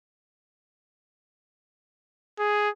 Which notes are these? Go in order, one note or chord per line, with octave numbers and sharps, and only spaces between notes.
G#4